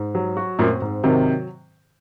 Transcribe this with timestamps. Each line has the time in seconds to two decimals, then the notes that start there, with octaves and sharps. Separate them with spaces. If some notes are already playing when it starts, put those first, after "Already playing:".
Already playing: G#2
0.15 F#3
0.37 F#4
0.59 F#2 A#2 C4
0.82 G#2
1.04 C3 D#3 F#3